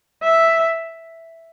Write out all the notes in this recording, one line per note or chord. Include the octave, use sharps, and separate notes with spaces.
E5